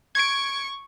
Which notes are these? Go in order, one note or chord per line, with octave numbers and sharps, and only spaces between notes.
C#6 G#6 C#7 D7